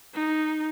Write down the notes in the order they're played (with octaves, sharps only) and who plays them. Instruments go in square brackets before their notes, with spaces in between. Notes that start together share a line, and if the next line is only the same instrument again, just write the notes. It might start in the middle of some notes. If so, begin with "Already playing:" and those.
[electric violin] D#4